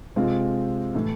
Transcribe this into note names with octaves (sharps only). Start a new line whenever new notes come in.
C3 G#3 C4 F4
A2 E3 A3